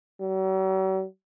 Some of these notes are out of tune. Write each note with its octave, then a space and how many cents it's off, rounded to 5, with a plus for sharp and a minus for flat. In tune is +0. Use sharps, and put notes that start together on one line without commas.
F#3 +45